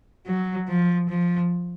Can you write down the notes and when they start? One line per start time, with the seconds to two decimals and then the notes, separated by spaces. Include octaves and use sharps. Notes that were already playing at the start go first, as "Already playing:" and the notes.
0.26 F#3
0.68 F3
1.09 F3